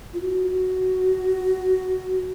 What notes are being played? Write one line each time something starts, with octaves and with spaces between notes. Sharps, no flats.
F4
F#4
F#4